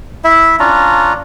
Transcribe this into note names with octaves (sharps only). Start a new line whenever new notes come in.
E4 E5
C#4 D4 F4 A#5